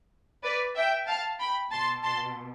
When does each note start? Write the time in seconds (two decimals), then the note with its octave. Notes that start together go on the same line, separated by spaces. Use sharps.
0.44 B4 D5
0.75 E5 G5
1.08 F5 A5
1.40 G5 B5
1.72 B2 A5 C6
2.04 A5 C6